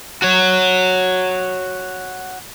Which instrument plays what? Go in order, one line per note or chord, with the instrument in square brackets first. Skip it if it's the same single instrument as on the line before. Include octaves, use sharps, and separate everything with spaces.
[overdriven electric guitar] F#4 C#5